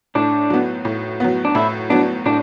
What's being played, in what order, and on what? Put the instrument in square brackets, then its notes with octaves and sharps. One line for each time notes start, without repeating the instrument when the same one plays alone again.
[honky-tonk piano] A2 [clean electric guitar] D4
[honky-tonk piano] F#3 B3
A2
F#3 B3
[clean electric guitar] D4
[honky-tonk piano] A2 [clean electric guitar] E4
[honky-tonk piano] F#3 B3 [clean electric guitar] D4
[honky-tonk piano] A2 [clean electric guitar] D4